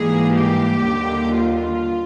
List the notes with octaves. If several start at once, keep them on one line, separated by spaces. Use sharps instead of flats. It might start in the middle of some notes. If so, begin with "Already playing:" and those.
Already playing: G#2 E3 G3 A#3 G#4
G4
D#2 D3 G3
F4